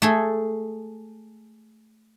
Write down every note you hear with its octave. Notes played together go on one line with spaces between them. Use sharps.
A3 G#4 A4